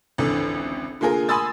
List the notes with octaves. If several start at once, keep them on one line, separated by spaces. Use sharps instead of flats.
G#1 C#2 D3 E3
D3 A#3 F4 G#4 A#4
G#5 B5 C6 D#6 E6 A6